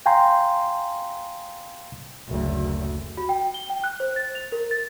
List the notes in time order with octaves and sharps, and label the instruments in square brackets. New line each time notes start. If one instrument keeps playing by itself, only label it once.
[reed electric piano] F5 G5 G#5 A#5 C6
[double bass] F#1 D2
[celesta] F#4
G5
G7
G5
F#6
C5
A6
F7
A#4
A6